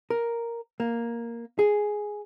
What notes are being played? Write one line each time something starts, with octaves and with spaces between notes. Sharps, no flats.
A#4
A#3
G#4